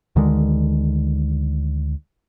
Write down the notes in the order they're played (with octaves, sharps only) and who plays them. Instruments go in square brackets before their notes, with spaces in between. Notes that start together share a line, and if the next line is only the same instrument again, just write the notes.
[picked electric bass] D2 D3 D#3 G#3